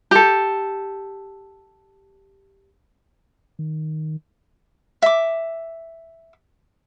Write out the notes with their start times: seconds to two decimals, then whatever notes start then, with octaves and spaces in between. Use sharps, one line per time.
0.11 G4 A4
3.59 D#3
5.02 E5 D6